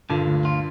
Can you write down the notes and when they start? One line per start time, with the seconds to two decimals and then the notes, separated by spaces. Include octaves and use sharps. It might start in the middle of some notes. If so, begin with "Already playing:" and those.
0.10 G2 A#2 D3
0.27 D2
0.45 F4